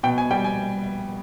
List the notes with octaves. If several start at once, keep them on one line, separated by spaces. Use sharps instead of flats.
B2 G5
G#5
G3 G5
G#5